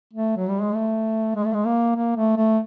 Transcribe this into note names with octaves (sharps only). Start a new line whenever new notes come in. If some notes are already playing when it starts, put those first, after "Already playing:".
A3
F#3
G3
G#3
A3
G#3
A3
G#3
A#3
A#3
A3
A3